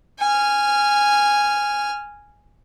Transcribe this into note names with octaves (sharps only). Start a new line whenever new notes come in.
G#5 F6